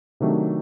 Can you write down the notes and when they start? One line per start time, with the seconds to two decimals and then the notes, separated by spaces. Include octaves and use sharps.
0.20 C3 D#3 F#3 A3 D4